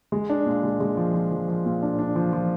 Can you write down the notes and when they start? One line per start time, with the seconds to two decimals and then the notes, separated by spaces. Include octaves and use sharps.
0.12 G#3
0.30 D4
0.46 A#2
0.63 G#3
0.80 G#3
0.97 F3
1.14 F3
1.31 F3
1.48 F3
1.66 A#2
1.82 D4
1.99 D4
2.16 F3
2.33 F3